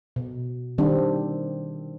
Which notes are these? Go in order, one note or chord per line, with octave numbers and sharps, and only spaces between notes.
B2
D#3 G3 C4 D4